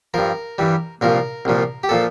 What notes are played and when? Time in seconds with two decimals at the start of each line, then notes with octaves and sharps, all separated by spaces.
0.14 G2 F3 A#4
0.58 G2 E3 G3
1.01 C2 A#2 F3 A#4
1.45 C2 A#2 F3
1.83 G4
1.89 A#2 F3 A4